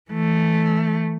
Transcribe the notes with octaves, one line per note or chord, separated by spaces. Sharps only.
E3 A3